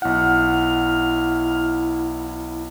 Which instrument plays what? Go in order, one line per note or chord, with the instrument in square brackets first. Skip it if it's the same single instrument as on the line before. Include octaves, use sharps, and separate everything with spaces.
[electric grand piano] B1 F#5 [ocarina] E4 [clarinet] F6